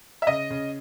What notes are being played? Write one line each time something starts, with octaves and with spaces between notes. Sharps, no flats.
E5
C#3 D#5
C#3